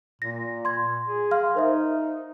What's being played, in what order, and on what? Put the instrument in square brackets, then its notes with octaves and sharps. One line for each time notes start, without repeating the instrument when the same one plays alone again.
[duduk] A#2 [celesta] A#6
[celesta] C6 G#6
[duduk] G#4
[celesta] F5 C6 F6
[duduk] D#4 [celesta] A#4 C5 E5